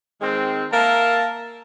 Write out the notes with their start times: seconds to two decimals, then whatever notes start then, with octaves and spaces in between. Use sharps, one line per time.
0.22 D#3 G#3 C4
0.72 A#3 A#4 E5 A5